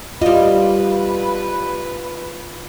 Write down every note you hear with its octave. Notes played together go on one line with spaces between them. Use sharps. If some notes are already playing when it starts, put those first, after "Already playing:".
G3 F4 B4 D#5